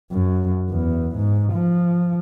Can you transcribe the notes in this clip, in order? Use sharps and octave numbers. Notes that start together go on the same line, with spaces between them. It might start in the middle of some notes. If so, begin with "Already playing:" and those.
F#2
E2
G#2
F3